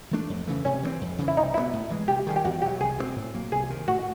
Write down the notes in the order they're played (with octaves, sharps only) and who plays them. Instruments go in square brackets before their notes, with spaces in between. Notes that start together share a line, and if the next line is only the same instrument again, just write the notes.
[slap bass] E3 A3 D4
F2
C#3 E3 A3
[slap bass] C3 [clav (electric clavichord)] C#4
[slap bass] E3 G3 C4
F2
C#3 E3
[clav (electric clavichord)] E4
[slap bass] C2 [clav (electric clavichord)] D#4
[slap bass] B2 G3 B3 [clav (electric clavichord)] E4
[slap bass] A2
E3 G#3
[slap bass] C3 [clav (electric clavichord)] G4
[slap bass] D#3 G3 [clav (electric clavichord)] G#4
[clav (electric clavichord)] G4
[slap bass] E2 [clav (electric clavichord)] F#4
[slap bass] B2 F#3 [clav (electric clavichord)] G4
[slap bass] C2 [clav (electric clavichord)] G#4
[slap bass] B2 G#3 C4
A2
F#3 A#3
[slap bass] C2 [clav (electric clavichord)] G#4
[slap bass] C3 D#3
[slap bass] A2 [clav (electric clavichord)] F#4